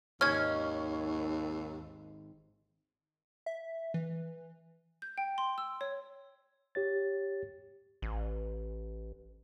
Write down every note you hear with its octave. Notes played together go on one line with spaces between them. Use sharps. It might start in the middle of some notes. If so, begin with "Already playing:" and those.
G#1 D#2 C#4 D#5 F6 G#6
E5
E3
G6
G5
C6
E6
C#5
G4 C#5 A6
A1